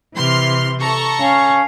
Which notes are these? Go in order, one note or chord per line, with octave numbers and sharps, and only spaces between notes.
C3 E3 C6 F6
A4 A#5 C#6
C#4 F5